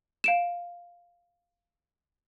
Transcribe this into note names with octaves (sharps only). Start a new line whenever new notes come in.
F5 D7 E7